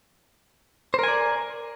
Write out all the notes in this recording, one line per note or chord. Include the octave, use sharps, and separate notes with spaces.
A#4 C5 D5 G#5